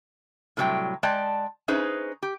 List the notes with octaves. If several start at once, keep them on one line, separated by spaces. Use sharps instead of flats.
A2 C3 F#3 G3 G5
G#3 D5 G5 A5
C#4 D#4 G#4 B4 C5
G4